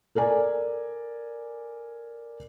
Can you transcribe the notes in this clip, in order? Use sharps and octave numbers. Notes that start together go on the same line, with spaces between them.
A4 A#4 D5 G#5